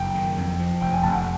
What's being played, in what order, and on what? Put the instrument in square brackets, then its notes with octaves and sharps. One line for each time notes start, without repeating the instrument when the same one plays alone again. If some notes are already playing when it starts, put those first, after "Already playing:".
Already playing: [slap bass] F#1 F#2 [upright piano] G5
[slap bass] D#3
F2
F3
[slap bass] F1 [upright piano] G5
[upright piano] G#5
[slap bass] F1 [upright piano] A5
[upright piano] F#5